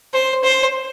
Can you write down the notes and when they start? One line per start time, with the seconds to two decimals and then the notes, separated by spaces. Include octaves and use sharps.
0.14 C5
0.44 C5